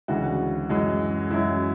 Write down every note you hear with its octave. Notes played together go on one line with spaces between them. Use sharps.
D2 C#3 E3 G#3 F#4
F#2 E3 G#3
F#2 E3 G#3 E4